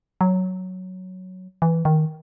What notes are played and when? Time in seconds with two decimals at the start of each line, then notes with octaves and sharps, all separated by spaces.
0.21 F#3
1.62 E3
1.85 D#3